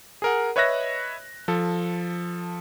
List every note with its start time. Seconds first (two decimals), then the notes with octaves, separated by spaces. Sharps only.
0.22 G#4 A#4 F#5
0.56 B4 C#5 D#5 E5 F#6 A#6
1.48 F3 A4